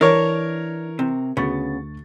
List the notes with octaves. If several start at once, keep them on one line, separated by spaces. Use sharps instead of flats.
E3 D4 A#4 C#5
C3
D2 C#3 B3 C#6 A6